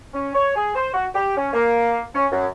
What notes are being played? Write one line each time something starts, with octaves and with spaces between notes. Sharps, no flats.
C#4
C#5
G#4
C5
F#4
G4
C#4
A#3
C#4
F#2